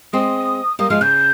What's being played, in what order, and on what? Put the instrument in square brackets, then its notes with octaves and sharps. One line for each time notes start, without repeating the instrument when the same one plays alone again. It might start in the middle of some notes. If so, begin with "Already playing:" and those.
[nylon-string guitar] G#3 C4 [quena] D#6
[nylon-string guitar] G3 A#3 [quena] D#6
[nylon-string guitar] F3 G#3 [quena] F6
[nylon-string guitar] C#3 [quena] G6